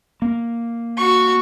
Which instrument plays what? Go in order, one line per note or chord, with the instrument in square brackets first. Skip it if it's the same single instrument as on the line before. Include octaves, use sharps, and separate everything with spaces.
[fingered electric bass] A#3
[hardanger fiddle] F#4 C#6